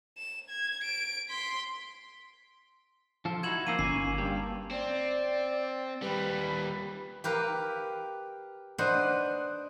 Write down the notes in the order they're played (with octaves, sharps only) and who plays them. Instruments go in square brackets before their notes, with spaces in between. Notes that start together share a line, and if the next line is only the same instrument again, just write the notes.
[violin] E7
G#6
D7
C6 B6
[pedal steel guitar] F3 F4 A4
[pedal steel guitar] D#4 E4 F#4 [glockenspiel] G#6 E7 F#7
[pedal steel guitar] F3 C4 D#4 [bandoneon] A#3 [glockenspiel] E6 C7 D#7
[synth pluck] G1 [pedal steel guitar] C#4 G#5 C#6 [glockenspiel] C7
[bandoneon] G2 [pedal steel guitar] G3 A#3 G4
[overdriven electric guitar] C4 [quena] D5
[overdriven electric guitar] D#2 G3 [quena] B4
[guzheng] G4 A#4 B4 F5
D4 B4 C5 D#5 F#5